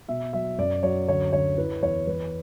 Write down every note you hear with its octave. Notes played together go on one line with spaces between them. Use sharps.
B2 E5
F#3 E5
F#2 D5
F#3 C#5
D2 C#5
D2 C#5
E4 B4
E2 C#5
E3 B4